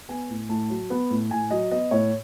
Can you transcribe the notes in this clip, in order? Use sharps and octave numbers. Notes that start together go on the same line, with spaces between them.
B3 G#5
A2
A2 A5
F#3
B3
A2
A2 G#5
F#3 D#5
B3 D#5
A2 C#5